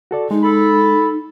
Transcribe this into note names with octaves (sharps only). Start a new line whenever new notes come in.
F#4 A4 D5
G#3 D#4
A4 B5